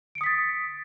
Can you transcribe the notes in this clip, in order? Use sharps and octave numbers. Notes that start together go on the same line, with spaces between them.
D#6 A6 B6 C#7 D7